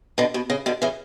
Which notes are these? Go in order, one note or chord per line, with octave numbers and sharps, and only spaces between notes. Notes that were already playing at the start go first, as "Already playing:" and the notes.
B2 D3
B2
C#3
B2 D3
C#3 E3